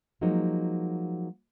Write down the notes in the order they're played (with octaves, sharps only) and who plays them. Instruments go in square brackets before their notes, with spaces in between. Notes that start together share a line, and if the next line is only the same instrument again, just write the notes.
[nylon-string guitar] F3 F#3 G#3 A#3 D#4